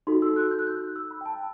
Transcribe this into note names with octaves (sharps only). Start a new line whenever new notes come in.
D#4 F#4 A4 C6
E6
F#6
G6
F#6
G6
E6
B5
G5
A5